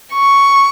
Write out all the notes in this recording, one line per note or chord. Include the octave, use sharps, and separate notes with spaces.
C#6